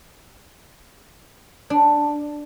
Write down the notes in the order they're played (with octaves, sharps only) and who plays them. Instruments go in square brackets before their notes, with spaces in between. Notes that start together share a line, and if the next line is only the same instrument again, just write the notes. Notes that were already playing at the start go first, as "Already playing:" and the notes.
[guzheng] D4